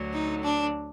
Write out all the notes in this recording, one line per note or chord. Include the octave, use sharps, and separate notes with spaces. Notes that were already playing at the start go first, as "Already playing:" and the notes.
Already playing: D2 D3 F#3
D#4
D4